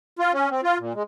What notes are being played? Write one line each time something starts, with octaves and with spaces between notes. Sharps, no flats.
F4
C#4
C4
F4
A#2
G#3